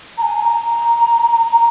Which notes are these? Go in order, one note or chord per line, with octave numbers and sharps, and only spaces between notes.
A#5
G#5
A#5
A#5